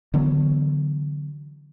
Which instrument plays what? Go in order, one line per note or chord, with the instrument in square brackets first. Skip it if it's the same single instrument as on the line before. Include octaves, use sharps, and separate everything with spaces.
[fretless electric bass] D3 E3 F#3 B3